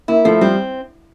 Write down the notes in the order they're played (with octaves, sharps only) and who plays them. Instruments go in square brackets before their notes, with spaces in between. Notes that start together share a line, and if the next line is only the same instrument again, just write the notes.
[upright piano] A#3 [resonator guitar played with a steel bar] E4
[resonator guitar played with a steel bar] F3 [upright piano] A3
[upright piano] G3 [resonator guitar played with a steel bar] C4